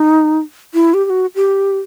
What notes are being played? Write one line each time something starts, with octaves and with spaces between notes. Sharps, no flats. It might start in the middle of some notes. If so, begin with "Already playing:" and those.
Already playing: D#4
E4
G4
G4
F#4
G4